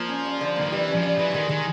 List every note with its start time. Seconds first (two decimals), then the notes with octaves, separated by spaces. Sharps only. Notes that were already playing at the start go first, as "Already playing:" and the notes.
Already playing: F3 A#3
0.09 C#4
0.25 G3
0.41 D3
0.56 D#3 A#3
0.71 E3 G3
0.88 C#4
0.95 F3
1.03 G3
1.18 E3 G#3
1.34 D#3 G#3
1.49 D#3 G#3